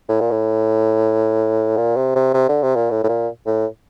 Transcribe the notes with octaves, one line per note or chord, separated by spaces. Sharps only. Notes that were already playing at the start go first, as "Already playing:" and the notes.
A2
A#2
A2
A#2
C3
C3
C3
D3
C3
A#2
A2
A2
A#2
A2